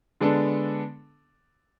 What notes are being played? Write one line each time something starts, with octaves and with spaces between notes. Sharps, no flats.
D3 G#3 B3 D4 A4